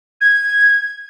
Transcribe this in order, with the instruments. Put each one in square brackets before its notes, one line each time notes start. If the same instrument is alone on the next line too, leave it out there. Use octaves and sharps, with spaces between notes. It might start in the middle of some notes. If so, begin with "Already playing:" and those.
[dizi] G#6